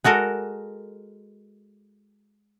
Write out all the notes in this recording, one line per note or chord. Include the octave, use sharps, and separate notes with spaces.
G#3 F#4 A4 A#4